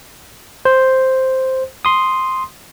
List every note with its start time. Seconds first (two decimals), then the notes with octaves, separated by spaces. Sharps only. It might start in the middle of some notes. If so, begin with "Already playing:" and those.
0.65 C5
1.85 C6 D#6